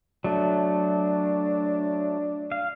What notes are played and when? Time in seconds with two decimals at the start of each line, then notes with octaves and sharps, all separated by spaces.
0.24 F#3 A3 D4
2.52 F5